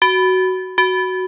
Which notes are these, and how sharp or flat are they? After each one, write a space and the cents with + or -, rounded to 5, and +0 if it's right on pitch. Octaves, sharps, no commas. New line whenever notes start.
F#4 +10
F#4 +5